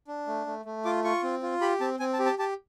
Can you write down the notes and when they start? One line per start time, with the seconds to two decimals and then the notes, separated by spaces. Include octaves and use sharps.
0.08 D4
0.27 A3
0.47 A3
0.65 A3
0.85 F4 D6
1.04 F4 C#6
1.23 C4
1.42 F4
1.61 G4 B5
1.81 C4 A5
1.99 C4 G#5
2.13 A5
2.19 G4
2.26 A5
2.39 G4 A5